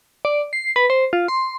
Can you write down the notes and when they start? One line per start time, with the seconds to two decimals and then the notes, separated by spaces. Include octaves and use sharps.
0.25 D5
0.53 C7
0.76 B4
0.90 C5
1.13 F4
1.28 C6